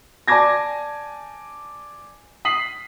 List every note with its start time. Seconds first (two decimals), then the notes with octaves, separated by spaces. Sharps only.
0.28 D5 G#5 A5 D6 G#6 A#6
2.45 D#6 B6 C7 F#7